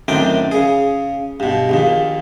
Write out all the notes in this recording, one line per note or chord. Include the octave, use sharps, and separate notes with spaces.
F#2 A2 D#3 C4 D4 G5
C#3 G#4
G2 B2
A#1 D#2 A#2